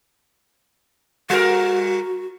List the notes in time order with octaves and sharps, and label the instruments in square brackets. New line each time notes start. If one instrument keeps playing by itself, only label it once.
[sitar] G3 A#4 [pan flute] F#4